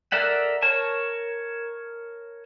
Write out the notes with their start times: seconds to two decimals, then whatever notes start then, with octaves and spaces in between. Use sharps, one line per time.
0.12 A4 A#4 D5 E5 F#5
0.62 A#4 C#5 A5